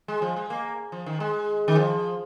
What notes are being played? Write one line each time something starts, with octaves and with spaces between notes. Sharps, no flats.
G#3
F3
G#3
A#3
F3
D#3
G#3
D#3
F3